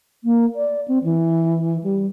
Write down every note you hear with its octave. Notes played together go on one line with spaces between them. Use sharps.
A#3
D5
C4
E3
G3